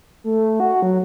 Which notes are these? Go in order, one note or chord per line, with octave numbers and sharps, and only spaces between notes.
A3
F#4
F#3